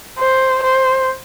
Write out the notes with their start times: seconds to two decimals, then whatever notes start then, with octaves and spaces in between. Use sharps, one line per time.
0.19 C5
0.63 C5